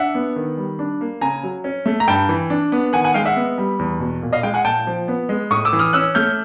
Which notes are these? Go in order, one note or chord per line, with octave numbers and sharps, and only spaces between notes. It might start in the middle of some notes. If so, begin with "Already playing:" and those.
Already playing: D4 E5 F#5
B3
D#3
G3
D4
A#3
C#3 G#5 A#5
F#3
C#4
A3
A#5
G2 G5 A5
E3
D4
B3
D#3 F#5 G#5
F#5 G#5
G#3 F5 G5
E5 F#5
B3
G3
E2
B2
A#2
D#5 F5
G#3 F5 G5
F#5 G#5
A#2 G5 A5
F3
B3
G#3
A2 C#6 D#6
D6 E6
E3
D#6 F6
C#4 E6 F#6
A3 F6 G6